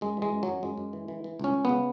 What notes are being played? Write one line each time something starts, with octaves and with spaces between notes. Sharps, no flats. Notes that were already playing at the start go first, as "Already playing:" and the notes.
F#2 G#3
E3 G#3
F#2
F#2 F#3
F#2 G#3
F#2
E3
E3
E3
C#2 C#4
C#2
C#3 B3